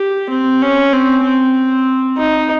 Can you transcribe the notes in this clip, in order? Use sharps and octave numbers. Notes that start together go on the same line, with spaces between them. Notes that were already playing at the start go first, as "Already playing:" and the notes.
Already playing: G4
C4
C#4
C4
C4
D#4